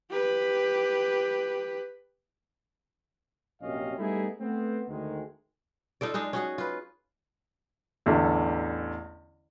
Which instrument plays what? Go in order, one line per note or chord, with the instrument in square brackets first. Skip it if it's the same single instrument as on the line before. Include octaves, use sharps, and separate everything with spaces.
[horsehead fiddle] G4 B4
[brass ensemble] A#1 F#2 C3 C#4 D#5 F5
G3 A3 B3 D#4 E4 G#4
A3 B3 C4
D2 D#3 G#3
[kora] D#4 F4 A4 D5
G#3 D4 D#4
C#4 F#4 G#4
F4 B4
[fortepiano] A1 E2 D3